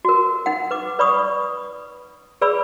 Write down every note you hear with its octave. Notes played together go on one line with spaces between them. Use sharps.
F#4 A#4
D#4 F#5
B4 D6
B4 D5 B5 C#6 D#6
G#4 B4 D5 B5 E6